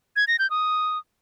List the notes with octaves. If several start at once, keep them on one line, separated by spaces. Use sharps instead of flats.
G#6
A#6
G6
D#6